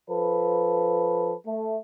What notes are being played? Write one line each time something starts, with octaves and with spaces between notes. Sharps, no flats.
F3 A4 B4
A3